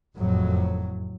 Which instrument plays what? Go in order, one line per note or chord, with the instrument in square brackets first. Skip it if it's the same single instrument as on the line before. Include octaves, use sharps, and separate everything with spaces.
[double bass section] F#1 F2 A2 F#3